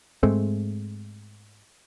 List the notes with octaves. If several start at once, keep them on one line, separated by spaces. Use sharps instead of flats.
G#2 G#3 A3 C4